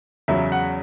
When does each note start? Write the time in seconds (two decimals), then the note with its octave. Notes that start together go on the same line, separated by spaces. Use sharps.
0.28 E2 C#3 F#3 E5
0.52 F#5